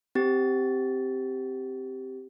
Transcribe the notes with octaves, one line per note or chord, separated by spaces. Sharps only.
C4 G4 A6